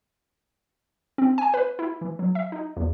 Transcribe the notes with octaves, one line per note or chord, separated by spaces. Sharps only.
C4
G#5
B4
E4
E3
F#3
E5
D#4
E2